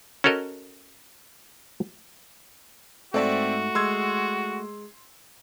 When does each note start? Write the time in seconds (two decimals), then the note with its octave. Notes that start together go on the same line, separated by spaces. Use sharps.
0.24 C#4 F#4 A4 A#4 D#5
3.14 G#2 A3 C4 F#4 D5 E5 A5
3.75 G#3 C6 E6 G#6